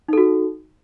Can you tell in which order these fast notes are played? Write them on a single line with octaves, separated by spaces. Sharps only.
D#4 A4 F#4